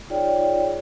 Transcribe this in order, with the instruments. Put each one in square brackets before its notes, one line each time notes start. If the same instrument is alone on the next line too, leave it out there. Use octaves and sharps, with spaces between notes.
[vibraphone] D#4 F4 G#4 C#5 D5 G5